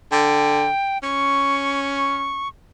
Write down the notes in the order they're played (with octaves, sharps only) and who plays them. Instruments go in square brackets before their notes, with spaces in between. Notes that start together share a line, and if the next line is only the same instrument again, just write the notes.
[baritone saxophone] D3 [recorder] G5
[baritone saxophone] C#4 [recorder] C#6